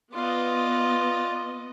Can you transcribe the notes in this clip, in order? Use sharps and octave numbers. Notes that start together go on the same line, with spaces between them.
B3 F4 D5 D#5